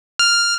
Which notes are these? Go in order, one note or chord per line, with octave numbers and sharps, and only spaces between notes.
F6